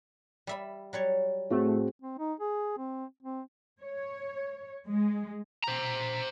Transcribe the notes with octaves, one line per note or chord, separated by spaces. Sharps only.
G3 E5 B5
F#3 G3 C#5
A2 A3 C4 F#4 G#4
C4
D#4
G#4
C4
C4
C#5
G#3
C5 A#5